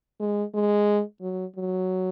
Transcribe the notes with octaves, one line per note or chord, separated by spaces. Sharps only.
G#3
G#3
F#3
F#3